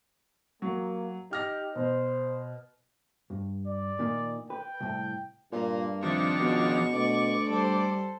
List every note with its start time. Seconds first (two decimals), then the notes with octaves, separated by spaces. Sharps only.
0.62 F#3 A#3
1.31 D#4 G4 F6 A#6
1.75 B2 C5
3.30 G2
3.67 D5
3.99 A#2 D#3
4.50 B4 G5
4.80 C2 A2
5.52 G2 A#2 A#3
6.03 C3 D#3 F3 D4 C#6
6.39 C#2 B2
6.93 D2 B2 D5
7.49 G3 A4 C5